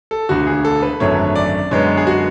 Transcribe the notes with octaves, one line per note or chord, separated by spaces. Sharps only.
A4
E1 D2 D3 F#4
G#4
A4
B4
G#1 F#2 D3 F#3 A3 C#5
D5
F#2 D3 G#3 B3 C#5
G#4
F#4